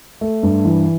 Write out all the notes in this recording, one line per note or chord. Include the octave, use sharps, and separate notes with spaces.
A3
G2
E3